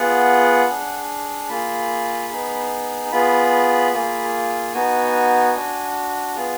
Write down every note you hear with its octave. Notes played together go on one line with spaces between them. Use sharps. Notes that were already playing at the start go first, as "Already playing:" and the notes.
Already playing: B3 F4 G#4 F#5
D4 G#4
A#3 F4 G#4 B5
B3 D#4 G#4
B3 F4 G#4 B5
A#3 F4 G#4
B3 D#4 F#4 G#5
D4 F#4
B3 F4 G#4